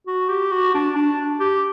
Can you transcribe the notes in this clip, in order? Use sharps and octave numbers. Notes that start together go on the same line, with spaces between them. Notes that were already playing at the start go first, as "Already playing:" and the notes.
F#4
G4
F#4
D4
D4
G4